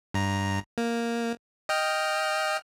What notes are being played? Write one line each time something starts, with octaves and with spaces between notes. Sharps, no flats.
G2 A#5
A#3
D#5 G5 F6